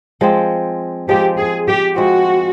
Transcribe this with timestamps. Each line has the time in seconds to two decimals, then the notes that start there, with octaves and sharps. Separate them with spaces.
0.21 F3 G#3 C4
1.08 F3 G#3 C4 G4
1.38 G#4
1.68 G4
1.96 F3 G#3 C4 F#4